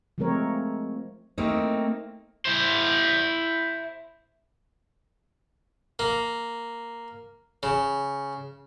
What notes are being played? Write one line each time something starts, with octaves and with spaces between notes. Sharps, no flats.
F3 G#3 A3 C4 A#4 C#5
A3 A#3 C4 D#4
E4 C5
A#3
C#3